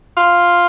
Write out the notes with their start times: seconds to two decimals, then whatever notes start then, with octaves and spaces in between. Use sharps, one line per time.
0.17 F4